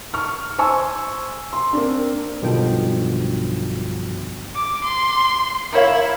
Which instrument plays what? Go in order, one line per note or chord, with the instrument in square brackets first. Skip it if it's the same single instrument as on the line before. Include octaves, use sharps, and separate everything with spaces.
[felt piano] C#6 F6
C5 G#5 C#6 E6
C6
A#3 C4 D4
[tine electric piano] B1 G2 B2 D3 F3 G5
[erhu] D6
C6
[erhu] E4 [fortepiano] A#4 C#5 F5